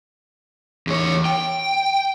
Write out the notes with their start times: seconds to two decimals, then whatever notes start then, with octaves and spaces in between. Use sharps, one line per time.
0.87 E2 C#5
1.25 G5